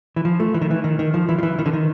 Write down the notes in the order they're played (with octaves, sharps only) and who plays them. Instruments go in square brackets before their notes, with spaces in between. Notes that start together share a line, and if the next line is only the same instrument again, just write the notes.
[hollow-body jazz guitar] E3
F3
A3
E3
D#3
E3
D#3
D#3
F3
E3
F3
E3
D#3
D3
D#3